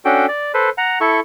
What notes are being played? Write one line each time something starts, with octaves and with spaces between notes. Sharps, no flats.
C#4 D4 F#4 A4 G5
D5
A4 B4 C5
F#5 A#5
E4 A4 C#6